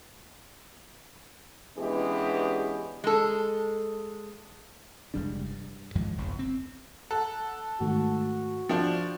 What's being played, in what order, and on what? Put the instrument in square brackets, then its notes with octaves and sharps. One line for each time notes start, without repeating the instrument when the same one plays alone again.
[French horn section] E3 G#3 B3 C#4 D4 G4
[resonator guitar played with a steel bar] G#3 A4
[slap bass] F1 G3 G#3 D4
G2
D#2 G#2 F3 G#3
F#1 B1 E2 G2
C4
[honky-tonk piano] A4 [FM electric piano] F#5 F#6
[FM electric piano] G#2 D#3 A3 [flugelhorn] F#4
[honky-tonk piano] F3 D4 [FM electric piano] G5 C6 C#6